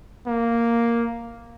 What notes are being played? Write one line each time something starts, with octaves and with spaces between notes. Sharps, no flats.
A#3